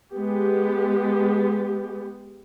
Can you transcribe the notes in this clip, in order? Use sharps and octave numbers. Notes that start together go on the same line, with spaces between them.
G#3 B3 G4